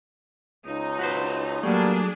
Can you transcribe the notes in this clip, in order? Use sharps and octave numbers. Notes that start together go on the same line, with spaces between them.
C#2 D#4
F#4 B4 C5
F#3 G3 A3 A#3 D4 G#4